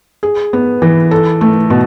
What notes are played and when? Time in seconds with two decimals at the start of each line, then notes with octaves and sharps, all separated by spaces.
0.23 G#4
0.53 B3
0.82 E3
1.11 A4
1.41 A3
1.70 B2